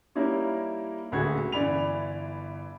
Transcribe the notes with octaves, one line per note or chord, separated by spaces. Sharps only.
G3 A#3 D#4 E4 A#4 C#5
D#1 D2 G#3 F#4 G#6
G1 E3 D5 B5 F7